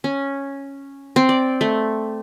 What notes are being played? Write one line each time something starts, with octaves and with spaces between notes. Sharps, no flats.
C#4
C4
D5
A3